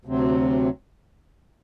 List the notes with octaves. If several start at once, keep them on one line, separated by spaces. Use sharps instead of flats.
D2 C3 F#3 C4